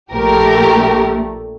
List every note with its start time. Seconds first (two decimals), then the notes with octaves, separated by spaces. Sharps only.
0.13 A#1 A#2 A3 G4 A#4